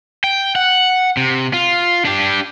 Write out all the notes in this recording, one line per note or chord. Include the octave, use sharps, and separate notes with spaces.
G5
F#5
C3
F4
D4 G4